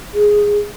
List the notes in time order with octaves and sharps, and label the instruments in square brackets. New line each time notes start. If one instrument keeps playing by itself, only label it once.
[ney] G#4